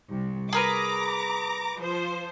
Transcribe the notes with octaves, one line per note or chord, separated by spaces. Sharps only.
C2
G#4 A#4 B4 A#5 D6
F3 C5